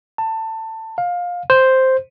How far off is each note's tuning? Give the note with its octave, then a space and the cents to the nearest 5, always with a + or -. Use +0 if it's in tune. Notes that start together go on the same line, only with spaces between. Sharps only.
A5 +20
F5 +20
C5 +0